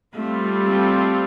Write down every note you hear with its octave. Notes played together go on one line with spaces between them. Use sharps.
G3 A3 C4 F4 A4
A3